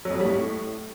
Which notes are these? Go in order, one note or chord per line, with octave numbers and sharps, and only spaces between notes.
F#3
F2
F#3
G3
A2